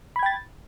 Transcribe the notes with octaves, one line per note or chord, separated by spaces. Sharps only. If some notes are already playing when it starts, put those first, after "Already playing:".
G5 B5 G#6 A6